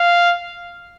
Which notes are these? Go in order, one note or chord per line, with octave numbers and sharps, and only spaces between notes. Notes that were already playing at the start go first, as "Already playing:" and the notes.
Already playing: F5